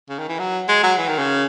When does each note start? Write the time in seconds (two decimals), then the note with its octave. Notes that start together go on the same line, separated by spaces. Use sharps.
0.09 C#3
0.19 D#3
0.29 E3
0.39 F#3
0.68 G#3
0.83 F#3
0.98 E3
1.08 D#3
1.19 C#3